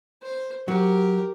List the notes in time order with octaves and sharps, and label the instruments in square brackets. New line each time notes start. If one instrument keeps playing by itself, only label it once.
[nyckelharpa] C5
[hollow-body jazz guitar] F#3 [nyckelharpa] G4 A#4